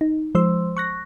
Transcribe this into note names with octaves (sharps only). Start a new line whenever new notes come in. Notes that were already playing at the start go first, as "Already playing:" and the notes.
D#4
F3 G#3 C5 C6 E6
C#6 F#6 A#6